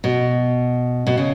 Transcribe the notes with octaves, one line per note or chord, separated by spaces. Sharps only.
B2
B2
C#3